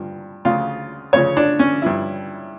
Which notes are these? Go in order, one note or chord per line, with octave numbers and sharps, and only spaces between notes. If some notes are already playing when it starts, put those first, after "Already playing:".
Already playing: G2 F3
D2 C#3 F3 F4
D2 C#3 F3 C#5
D4
C#4
G2 F3 E4